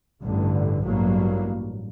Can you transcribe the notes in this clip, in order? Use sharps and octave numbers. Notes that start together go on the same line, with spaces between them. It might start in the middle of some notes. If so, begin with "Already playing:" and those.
A1 G2 D3
A1 G2 F#3 A#3